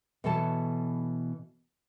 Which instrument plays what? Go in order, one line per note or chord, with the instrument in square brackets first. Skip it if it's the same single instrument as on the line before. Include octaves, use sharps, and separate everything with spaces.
[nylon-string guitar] B2 E3 F#4 A4 C#5 A5